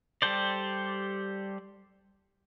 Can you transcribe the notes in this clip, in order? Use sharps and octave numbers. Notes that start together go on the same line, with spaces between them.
G3 G4 A4 C5 D5